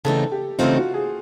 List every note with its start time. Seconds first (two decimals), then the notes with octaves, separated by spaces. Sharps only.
0.05 C#3 E3 A3 C4 D#4 A4
0.32 G4
0.59 C#3 E3 A3 C4 D#4 F4
0.76 F#4
0.94 G#4